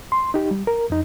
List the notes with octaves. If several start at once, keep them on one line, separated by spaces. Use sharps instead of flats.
C6
D#4 G4
G3
A#4
F2 D#4